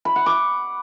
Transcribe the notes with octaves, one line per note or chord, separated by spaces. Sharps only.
B5
F#5
D6